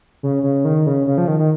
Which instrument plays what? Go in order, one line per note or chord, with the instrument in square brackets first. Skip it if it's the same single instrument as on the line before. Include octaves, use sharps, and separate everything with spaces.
[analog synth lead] C#3
C#3
D#3
C#3
C#3
F3
D#3
D#3